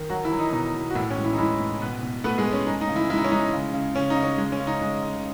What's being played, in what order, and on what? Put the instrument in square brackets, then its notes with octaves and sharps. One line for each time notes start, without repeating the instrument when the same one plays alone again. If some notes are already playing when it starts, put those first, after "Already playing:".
Already playing: [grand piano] D#3
F#3 F#4
E3 E4
F#3
D#4
B2 D#4
B2
F#4
A2 E3 E4
C#4
G#3
E3 E4
D#4
E3 G#3 E4
A2
B2 B3 B4
B2
A3 B3 B4
G#3 G#4
A3
C#4
G#3 D#4
D#4
C#3
E3 E4
G#3 E4
D#4
C#4
G#3 D#4
C#3
C#3
C#3 C#4
D#4
C#3
C#4
G#3
C#4
C#3
D#4
G#3
C#3